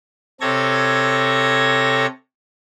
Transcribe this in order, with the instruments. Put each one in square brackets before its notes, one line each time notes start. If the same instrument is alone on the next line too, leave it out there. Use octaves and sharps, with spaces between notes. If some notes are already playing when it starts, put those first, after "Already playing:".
[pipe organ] C3 A4 C#5 G#6 A#6